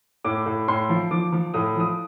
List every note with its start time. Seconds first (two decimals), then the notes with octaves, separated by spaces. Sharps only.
0.24 A2 D6
0.46 A2
0.68 A2 C6
0.89 F3
1.11 F3 D6
1.32 F3
1.54 A2 D#6
1.76 F3 D#6